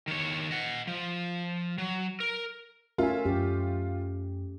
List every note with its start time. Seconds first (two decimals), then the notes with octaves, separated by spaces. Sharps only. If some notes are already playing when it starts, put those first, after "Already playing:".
0.08 D#3 C#5
0.51 D#5 F#5
0.87 F3
1.78 F#3
2.20 A#4
2.98 A3 C#4 F4 A#4 E5 G#5
3.25 F#2 C#4 G4